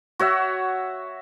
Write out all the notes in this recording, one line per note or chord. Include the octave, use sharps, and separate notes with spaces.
F#4 C#5 E5